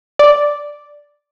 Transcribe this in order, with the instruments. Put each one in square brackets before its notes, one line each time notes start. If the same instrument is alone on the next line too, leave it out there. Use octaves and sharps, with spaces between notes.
[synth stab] D5